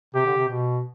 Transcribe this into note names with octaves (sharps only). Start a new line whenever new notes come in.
C3 G4
D3
C3
B2